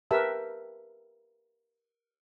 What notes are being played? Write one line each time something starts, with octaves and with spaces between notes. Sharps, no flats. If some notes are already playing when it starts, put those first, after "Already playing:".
G4 A#4 B4 E5 A5 E6